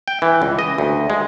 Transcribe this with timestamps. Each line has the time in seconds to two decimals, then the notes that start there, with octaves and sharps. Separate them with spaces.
0.08 G5
0.22 E3
0.42 C#2
0.59 D#5
0.78 D2
1.10 G#3